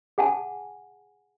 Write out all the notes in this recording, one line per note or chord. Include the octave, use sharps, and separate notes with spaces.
G#4 F#5 G#5 A5